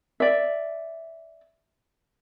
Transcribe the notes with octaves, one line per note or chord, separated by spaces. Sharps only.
D5 E5